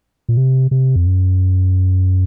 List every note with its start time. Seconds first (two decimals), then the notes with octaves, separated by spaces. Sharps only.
0.29 A#2
0.37 C3
0.71 C3
0.96 F2
1.06 F#2